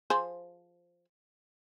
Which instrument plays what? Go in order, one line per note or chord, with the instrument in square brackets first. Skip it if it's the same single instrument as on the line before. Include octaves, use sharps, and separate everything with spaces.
[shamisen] F3 G#4 C5